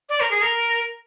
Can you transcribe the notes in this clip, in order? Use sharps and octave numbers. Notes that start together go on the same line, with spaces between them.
D5
A#4
G#4
A#4